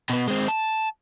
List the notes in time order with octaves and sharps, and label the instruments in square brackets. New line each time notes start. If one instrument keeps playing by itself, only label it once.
[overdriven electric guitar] B2 B3
G#3 C4
A5